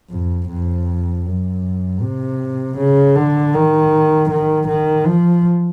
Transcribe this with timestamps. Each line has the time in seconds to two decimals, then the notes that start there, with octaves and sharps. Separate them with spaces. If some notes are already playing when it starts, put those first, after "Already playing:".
0.10 F2
0.49 F2
1.26 F#2
2.02 C3
2.78 C#3
3.16 D3
3.54 D#3
4.30 D#3
4.68 D#3
5.06 F3